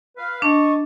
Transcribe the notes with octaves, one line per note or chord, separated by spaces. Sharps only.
B4 F5
D4 D#5 A5 C#6